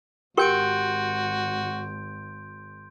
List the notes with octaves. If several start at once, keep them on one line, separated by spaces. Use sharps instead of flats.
G#1 F#4 G4 A#4 G5 C6 G6 D7